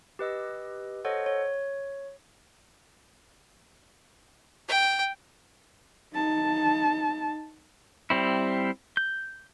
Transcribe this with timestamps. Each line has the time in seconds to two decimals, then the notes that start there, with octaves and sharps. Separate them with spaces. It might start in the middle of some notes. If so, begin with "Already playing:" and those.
0.19 G4 B4 D#5 E6
1.05 A4 C5 C#5 D#5 F#5
1.26 C#5
4.68 G5
6.14 D#4 A5
8.10 G3 C4 E4
8.97 G6